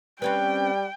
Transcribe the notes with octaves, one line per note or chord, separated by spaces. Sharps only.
G3 C4 C#4 B4 G5